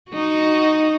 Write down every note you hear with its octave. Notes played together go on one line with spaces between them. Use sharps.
D#4 F#4